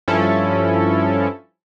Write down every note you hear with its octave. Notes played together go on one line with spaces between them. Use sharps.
G2 F3 C#4 E4 A4